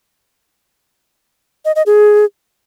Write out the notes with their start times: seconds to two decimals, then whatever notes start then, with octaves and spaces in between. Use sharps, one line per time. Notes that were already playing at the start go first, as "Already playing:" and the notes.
1.65 D#5
1.76 D#5
1.86 G#4